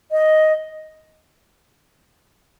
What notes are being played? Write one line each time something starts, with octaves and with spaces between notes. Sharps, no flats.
D#5